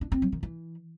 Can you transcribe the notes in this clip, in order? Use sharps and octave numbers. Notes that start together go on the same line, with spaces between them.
D4
C4
F#3
D#3
E3